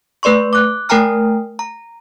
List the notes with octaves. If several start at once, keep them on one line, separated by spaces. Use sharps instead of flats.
A3 B4 D5 C6 C#6
D6 F#6
A3 A#4 G5 G#5 A#5 F6
A#5